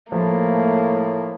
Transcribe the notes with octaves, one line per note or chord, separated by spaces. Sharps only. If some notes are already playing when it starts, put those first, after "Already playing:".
A2 F3 A3 A#3